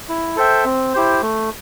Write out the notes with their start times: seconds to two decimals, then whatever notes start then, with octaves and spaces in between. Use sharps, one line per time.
0.09 E4
0.36 A4 C5 E5 G5
0.65 C4
0.94 E4 G4 C5
1.22 A3